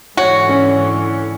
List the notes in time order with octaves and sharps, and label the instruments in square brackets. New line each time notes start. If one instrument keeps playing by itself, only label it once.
[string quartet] G#2 D3 E3 [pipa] F#4 [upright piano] C#5
[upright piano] C#4